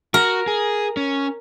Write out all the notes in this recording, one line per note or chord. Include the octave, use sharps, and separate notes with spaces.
F#4 A#4
G#4
C#4